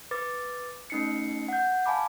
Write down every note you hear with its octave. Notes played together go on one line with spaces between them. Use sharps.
B4 D6 A6
A3 C#4 D#4 C7 C#7
F#5 G6
F5 G#5 A5 B5 D6